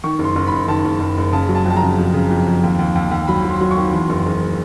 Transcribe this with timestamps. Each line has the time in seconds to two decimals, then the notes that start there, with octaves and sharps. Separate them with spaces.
0.04 D#3 C#6
0.19 F#1
0.24 C6
0.35 F#1
0.47 F#1 B5
0.68 D#3 A5
0.85 F#1
1.00 F#1
1.17 F#1
1.32 C#3 A5
1.49 F#3
1.55 A5
1.66 F2 A5
1.76 A#5
1.82 C#3
1.98 F2
2.14 C#3
2.30 F2
2.46 F2
2.63 D#2
2.79 D#2
2.95 D#2
3.11 D#2
3.28 F#3 B5
3.44 F#3
3.50 C6
3.61 F#3
3.71 C#6
3.77 D#3
3.92 E2 C6
4.09 F#1
4.26 F#1